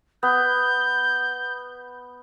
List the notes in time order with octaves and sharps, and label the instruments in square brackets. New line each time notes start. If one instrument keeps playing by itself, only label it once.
[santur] B3 [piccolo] G6